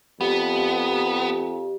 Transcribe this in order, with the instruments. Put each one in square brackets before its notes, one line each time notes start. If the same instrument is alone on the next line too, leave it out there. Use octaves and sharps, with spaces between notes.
[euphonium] F2 [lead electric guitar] B3 [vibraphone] G4